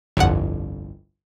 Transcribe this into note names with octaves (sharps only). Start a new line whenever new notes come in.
G1 C2 F2 F#5